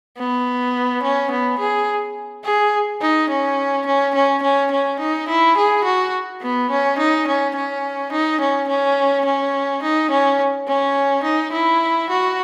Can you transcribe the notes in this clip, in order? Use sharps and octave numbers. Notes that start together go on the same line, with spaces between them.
B3
C#4
B3
G#4
G#4
D#4
C#4
C#4
C#4
C#4
C#4
D#4
E4
G#4
F#4
B3
C#4
D#4
C#4
C#4
D#4
C#4
C#4
C#4
D#4
C#4
C#4
D#4
E4
F#4